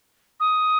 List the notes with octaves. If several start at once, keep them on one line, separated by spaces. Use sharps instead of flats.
D#6